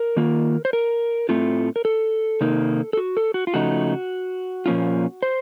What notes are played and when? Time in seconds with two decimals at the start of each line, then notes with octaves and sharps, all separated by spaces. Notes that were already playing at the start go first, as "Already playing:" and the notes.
Already playing: A#4
0.16 D#3 A#3 F4
0.65 C5
0.73 A#4
1.29 A2 A3 C4 F4
1.76 A#4
1.85 A4
2.41 C3 D#3 A#3 D#4
2.93 A4
2.97 F#4
3.17 A4
3.34 F#4
3.47 F4
3.54 C#3 F3 A3 D#4 F#4
4.66 A#2 F3 A#3 C#4 F4
5.22 C5